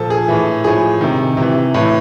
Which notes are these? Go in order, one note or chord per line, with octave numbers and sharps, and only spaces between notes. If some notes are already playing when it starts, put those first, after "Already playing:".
Already playing: A#2 F3 A4
G#4
A2 E3
A2 F3 G#4
C3 D#3
C3 E3
A2 E3